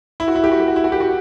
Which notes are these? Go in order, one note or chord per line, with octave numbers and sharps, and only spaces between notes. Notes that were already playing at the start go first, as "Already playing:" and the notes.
E4
F#4
E4
G4
F#4
G4
F#4
E4
F#4
G4
F#4